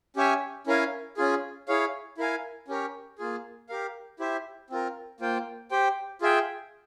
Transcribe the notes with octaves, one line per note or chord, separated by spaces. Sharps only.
C#4 G4 C#5 E5 G#5
C#4 E4 A#4 F5 G#5
C#4 F4 G#4
E4 G#4 C#5 F5
E4 A#4 F5 G#5
C#4 G4 A#4 C#5
A#3 F4 G#4
G4 A#4 F5
E4 G4 C5 E5
C4 F4 A#4
A#3 F4 C5 G5
G4 C5 G5
F4 G#4 E5 G5